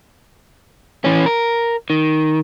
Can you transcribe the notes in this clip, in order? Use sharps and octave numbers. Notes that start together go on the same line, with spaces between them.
E3 C#4
A#4
D#3